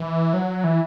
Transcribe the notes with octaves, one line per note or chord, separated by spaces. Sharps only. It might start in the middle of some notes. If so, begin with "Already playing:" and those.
Already playing: E3
F#3
E3